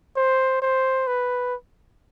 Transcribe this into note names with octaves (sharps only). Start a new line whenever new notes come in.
C5
C5
B4